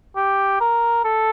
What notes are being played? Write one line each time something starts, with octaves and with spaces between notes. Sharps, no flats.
G4
A#4
A4